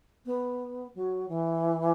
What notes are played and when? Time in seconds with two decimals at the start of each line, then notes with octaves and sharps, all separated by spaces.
0.25 B3
0.95 F#3
1.28 E3